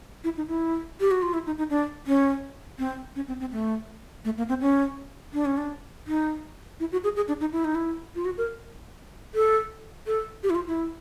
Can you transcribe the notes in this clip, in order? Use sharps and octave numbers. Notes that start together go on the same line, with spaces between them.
E4
D#4
E4
G4
F#4
F4
E4
D#4
D#4
D4
C#4
C4
C#4
C4
C4
A3
A3
A#3
C4
C#4
D4
C#4
D4
D#4
E4
F#4
G#4
G#4
D4
D#4
E4
D#4
E4
F4
F#4
A#4
A4
A4
G4
E4
F4
E4